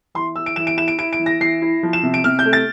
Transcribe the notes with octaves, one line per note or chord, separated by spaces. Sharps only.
E3 C6
E3 E6
D7
E3 E7
D7
E4 E7
D7
E4 D7
D7
E3
A#6
E3 C7
E4
F3
E7
C3
D7
C3 F6
G6
A3
A6